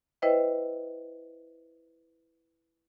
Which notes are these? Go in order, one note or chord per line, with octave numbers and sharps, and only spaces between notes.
E4 B4 C5 D#5 E5 G5